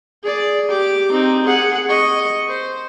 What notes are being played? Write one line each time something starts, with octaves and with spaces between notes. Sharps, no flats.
G#4 D5
G4 D6
C4 D#4
G#4 F#5
D#5 C#6
C5